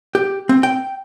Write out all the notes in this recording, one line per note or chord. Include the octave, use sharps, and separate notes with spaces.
G4
C4
G5